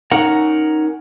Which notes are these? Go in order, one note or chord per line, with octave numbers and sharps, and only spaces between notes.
C#4 D#4 A#4 F#5